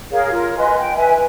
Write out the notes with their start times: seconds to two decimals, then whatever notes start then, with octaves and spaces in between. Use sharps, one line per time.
0.11 G#4 A#4 C#5 F5
0.31 F4 A#4
0.57 B4 D#5 G#5 C6
0.78 G5
0.95 B4 E5 G#5
1.13 B4